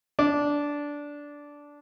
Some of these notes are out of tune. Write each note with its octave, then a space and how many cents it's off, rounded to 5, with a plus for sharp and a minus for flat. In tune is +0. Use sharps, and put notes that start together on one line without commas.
D4 -10